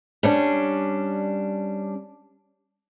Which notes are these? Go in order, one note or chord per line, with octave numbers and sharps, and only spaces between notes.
G3 C#4 D4